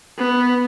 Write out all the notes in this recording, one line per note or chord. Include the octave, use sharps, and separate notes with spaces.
B3